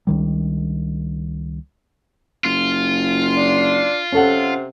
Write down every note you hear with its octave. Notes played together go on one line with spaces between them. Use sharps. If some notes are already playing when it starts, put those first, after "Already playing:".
C#2 D#3 G3
F#1 F4
D4
C3 C#4 A4 F#5